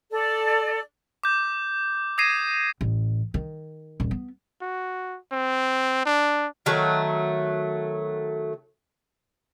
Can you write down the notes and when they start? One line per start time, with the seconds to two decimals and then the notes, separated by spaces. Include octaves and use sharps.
0.12 A4 D5
1.23 D6 G6
2.18 D#6 G#6 A#6 C7 D#7 E7
2.81 A1
3.34 D#3
4.00 D#1
4.11 B3
4.62 F#4
5.32 C4
6.05 D4
6.66 D#3 F#3 A3